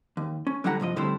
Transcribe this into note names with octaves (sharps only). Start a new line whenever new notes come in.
D#2
C#4
D3 F#3 G3 E4 F#5 A#5
C2 G2 F3 D#5
A2 D3 G3 C4 E4 C5